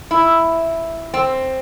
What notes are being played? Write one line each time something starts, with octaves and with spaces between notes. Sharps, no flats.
E4
C4